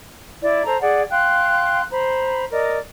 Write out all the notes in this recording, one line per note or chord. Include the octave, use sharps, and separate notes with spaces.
E4 D5
A4 C5 A#5
G#4 D5 F#5
F5 G5 C6 F#6
C5 A#5 B5
A#4 D5 D#5